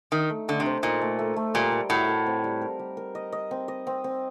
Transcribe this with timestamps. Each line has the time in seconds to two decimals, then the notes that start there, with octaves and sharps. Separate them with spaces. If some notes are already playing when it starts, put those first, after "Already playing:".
0.12 D#3 D#4
0.30 A3
0.48 D3 A3
0.60 C3
0.66 C5
0.83 A#2 D#4
1.01 A3
1.19 A3
1.36 A3
1.54 A#2 G3
1.72 A#4
1.90 A2 F#4
2.09 A#4
2.26 C4
2.44 G3
2.61 A#4
2.79 G3
2.97 A#4
3.15 D#5
3.32 D#5
3.51 C4
3.68 D#5
3.87 C4
4.04 C4